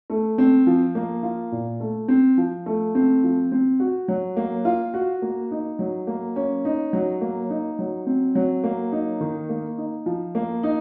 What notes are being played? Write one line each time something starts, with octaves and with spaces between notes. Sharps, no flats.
A3
C4
F3
A#3
F4
A#2
A3
C4
F3
A3
C4
F3
C4
F#4
F#3
A#3
F4
F#4
A#3
D#4
F#3
A#3
C#4
D#4
F#3
A#3
D#4
F#3
C4
F#3
A#3
D#4
D#3
A#3
D#4
F3
A#3
D#4